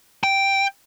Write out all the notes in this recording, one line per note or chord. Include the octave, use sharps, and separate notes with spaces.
G5